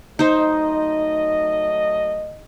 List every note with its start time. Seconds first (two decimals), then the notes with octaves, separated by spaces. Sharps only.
0.19 F#3 A3 D#4 C5 D#5